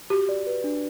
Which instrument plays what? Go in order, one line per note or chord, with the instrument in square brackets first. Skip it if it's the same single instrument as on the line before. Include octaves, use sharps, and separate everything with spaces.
[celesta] F#4 [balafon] G4
[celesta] D5
B4
D4